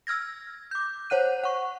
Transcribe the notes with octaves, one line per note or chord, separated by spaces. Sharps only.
E6 F6 G#6 A#6
D6 G6
C5 C#5 F#5 F#6 D#7
F#5 C#6